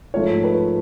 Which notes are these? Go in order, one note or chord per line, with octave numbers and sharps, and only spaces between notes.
G#2 F3 A3 F4 C#5
B4